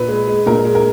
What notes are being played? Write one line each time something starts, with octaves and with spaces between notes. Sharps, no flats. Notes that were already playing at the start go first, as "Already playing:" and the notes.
Already playing: A#2 B4
G#3
G#3
A#2 A#4
G#3
A#4